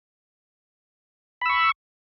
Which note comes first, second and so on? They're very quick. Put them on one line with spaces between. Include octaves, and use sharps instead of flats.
B5 E6 C#6